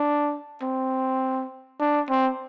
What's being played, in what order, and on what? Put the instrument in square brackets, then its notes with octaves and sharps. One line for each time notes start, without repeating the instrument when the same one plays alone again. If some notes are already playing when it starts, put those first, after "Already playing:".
Already playing: [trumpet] D4
C4
D4
C4